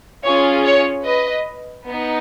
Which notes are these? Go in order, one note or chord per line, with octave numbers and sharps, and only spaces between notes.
C#4 F4 G#4 C#5
C#5
B4 D#5
B3 D#4